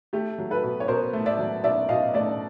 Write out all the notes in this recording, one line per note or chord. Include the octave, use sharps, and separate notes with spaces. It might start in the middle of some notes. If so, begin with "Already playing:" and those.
A3 G4
F#3
A4 B4
B2
C#5
B2 A#4 C5
A3
D5 E5
F#3
B2 D5 E5
B2 D#5 F5
A3 D5 E5